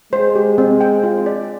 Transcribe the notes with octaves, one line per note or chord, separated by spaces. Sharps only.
G#3 C5
G4
C4
G5
F4
D5